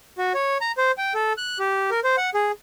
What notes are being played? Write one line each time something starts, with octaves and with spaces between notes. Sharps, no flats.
F#4
C#5
A#5
C5
G5
A4
F#6
G4
A#4
C5
F#5
G#4